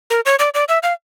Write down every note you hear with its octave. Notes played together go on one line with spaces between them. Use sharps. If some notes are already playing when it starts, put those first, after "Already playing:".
A#4
C#5
D5
D5
E5
F5